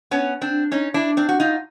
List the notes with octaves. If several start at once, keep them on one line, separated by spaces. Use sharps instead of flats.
B3 C#4
C4 D4
C#4 D#4
D4 E4
C4 D4
F#4
D#4 F4